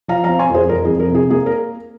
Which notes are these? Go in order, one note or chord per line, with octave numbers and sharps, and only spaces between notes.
F3 F5 A#5
F5 A#5
C4
G#5 C6
F2 G#4 C5
F2 A#4
G#4
F2
A#4
C3 G#4
A#3 G#4
A#4